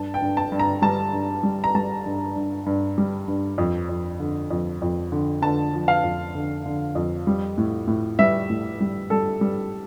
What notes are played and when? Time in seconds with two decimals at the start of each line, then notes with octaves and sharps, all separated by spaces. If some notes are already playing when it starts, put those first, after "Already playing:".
Already playing: G2 A5
0.14 G5
0.22 G2
0.37 A5
0.52 G2
0.59 A#5
0.82 G3 A5
1.13 G2
1.43 G3
1.64 A#5
1.75 G3 A5
2.06 G2
2.36 G2
2.66 G2
2.98 G3
3.28 G2
3.58 F2
3.89 F2
4.20 D3
4.50 F2
4.82 F2
5.12 D3
5.42 D3 A5
5.73 F3
5.88 F5
6.03 F2
6.35 D3
6.66 D3
6.95 F2
7.27 G3
7.58 A2
7.87 A2
8.19 G3 E5
8.50 A2
8.80 G3
9.10 G3 A4
9.41 G3